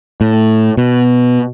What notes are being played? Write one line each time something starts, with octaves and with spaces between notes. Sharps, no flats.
A2
B2